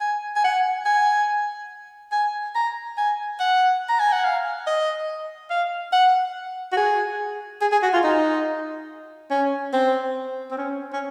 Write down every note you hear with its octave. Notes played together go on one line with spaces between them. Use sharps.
G#5
G#5
F#5
G#5
G#5
A#5
G#5
F#5
A#5
G#5
F#5
F5
D#5
F5
F#5
F#4
G#4
G#4
G#4
F#4
F4
D#4
C#4
C4
C4
C#4
C#4